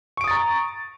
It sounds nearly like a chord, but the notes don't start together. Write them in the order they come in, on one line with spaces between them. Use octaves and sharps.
C#6 D7 D#6 A6 A#5